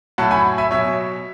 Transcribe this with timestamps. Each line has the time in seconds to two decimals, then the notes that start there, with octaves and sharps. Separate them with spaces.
0.18 A2 F#3 F#5 A5
0.31 G#5 B5
0.58 E5 G#5
0.71 B2 F#3 C#5 E5